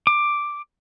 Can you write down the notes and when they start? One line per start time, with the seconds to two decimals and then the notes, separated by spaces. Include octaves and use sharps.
0.07 D6